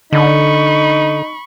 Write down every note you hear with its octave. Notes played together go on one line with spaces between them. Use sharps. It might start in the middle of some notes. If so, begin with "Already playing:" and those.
D3 D#4 B5 C#6